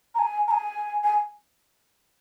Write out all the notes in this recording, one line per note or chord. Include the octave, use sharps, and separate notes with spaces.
A#5
G#5
A#5
G#5
G#5